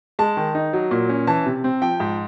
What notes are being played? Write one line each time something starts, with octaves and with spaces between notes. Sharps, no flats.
G#3 A5
D#3
D#4
F#3
A#2
C#4
E3 A5
C3
C4
F3 G5
G#2